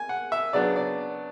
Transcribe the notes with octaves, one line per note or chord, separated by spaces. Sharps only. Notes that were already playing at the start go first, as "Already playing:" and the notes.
Already playing: G#5
F#5
E5
C#3 F#3 B3 D4 D5
D5